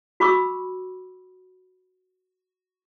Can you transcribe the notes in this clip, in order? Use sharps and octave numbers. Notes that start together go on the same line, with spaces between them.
F#4 B5 C#6 D6 E6